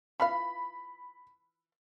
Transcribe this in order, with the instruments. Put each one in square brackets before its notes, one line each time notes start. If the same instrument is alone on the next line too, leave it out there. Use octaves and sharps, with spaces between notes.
[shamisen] E3 F4 F5 [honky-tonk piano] B5